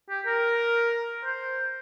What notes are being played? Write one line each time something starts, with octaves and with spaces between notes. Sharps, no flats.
G4
A#4
C5